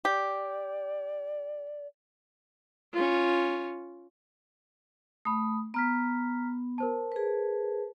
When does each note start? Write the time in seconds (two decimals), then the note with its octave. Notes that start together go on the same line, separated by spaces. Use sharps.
0.05 G4 D5
2.93 C#4 F4
5.25 A3 B5 D#6
5.74 B3 A#5 F6 B6
6.78 A#4 C5 A5
7.12 G#4 B4